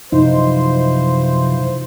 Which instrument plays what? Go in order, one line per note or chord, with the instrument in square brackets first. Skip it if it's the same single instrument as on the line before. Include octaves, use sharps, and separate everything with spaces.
[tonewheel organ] F#2 E3 F3 [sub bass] C3 [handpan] D#4 [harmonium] C5